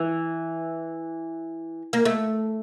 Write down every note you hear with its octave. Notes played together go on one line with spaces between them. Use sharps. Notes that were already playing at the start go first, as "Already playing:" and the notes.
Already playing: E3
A#3
A3